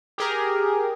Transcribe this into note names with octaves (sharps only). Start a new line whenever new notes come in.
G4 G#4 A#4